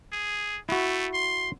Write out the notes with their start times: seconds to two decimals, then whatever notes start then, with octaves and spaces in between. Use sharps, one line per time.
0.13 G#4
0.69 A3 E4 F#4
1.13 C6